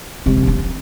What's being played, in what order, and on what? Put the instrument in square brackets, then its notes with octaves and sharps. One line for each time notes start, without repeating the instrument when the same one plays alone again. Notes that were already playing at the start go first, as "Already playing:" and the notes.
[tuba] C3 [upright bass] G#3
[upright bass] A#3
D#4
C#4
C#4